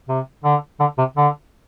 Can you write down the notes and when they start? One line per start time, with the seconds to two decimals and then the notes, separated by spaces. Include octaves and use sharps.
0.08 C3
0.44 D3
0.80 D3
0.98 C3
1.17 D3